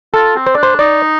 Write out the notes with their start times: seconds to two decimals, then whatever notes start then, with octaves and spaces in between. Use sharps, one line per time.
0.14 F4 A4
0.36 C4
0.47 C5
0.55 D4 D5
0.63 C5
0.79 D#4 D5